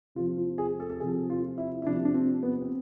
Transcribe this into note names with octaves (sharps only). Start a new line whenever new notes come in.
C3 F3 F4
F4
G#4
A4
A4
C3 F3 G#4
F4
E4
E4
C3 F3 D4
D4
C4
B3
C4